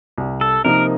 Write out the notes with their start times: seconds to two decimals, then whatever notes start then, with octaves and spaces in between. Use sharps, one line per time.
0.18 C2
0.41 A4
0.64 C3 F3 A#3 D#4 A#4